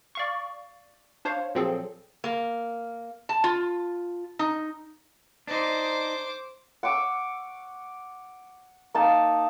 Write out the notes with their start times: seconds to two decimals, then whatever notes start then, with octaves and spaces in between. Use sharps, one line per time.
0.15 D5 F5 C#6
1.25 D4 C5 C#5 F5
1.55 A#2 F3 F#3 C4 G#4 A4
2.24 A#3
3.29 A5
3.44 F4
4.39 D#4
5.47 D4 D#4 C5 D6
6.83 F#5 C#6 D6 E6
8.94 A#3 D#4 A5